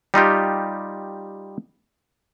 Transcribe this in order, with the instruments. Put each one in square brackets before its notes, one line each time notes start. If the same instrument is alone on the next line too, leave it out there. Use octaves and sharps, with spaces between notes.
[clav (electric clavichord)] G3 D#4 F4 G4